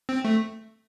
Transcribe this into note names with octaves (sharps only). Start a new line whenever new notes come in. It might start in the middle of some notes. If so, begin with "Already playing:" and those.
C4
A3